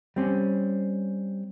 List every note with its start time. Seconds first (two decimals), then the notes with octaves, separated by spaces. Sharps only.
0.16 G3 C4 C#4